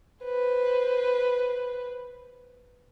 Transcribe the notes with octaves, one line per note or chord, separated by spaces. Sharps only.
B4 C5